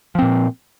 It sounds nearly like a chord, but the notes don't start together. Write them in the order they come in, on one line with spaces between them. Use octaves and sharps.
F3 C4 A#2